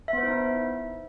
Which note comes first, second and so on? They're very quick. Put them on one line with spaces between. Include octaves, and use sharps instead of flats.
E5 B3 C5 E4 D#4